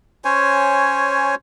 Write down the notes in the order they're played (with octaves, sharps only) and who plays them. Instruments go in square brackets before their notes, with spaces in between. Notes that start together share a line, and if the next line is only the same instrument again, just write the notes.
[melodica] C#4 C5 C#5 G#5